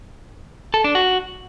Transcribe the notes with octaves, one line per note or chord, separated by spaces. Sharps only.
A4
D4
F#4